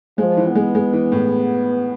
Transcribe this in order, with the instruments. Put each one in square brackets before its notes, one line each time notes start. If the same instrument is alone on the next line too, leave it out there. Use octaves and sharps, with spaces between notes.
[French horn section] F3 [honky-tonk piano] G#3
[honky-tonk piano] E3
[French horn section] B3
[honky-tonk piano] G#3
G#3
E3
A2